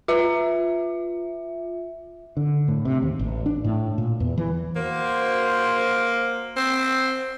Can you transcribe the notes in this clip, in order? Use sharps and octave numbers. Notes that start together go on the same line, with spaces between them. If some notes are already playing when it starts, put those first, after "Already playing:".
F4 E5
D3
A2
C3
D#2
A1
D4
A2
A#2
E2
E3
A#3 F#4 C5
C4